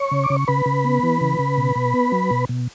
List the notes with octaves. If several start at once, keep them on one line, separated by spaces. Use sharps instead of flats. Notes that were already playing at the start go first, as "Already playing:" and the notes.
Already playing: C#5 C#6
C#3
D6
C#3
C#6
C#3 B4 B5
C#3
B3
E3
C#3
C#3
B2
B2
B3
F#3
B2
B2